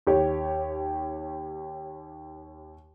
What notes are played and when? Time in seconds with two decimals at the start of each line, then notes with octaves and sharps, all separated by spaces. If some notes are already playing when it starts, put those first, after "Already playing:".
0.07 D#2 G4 C#5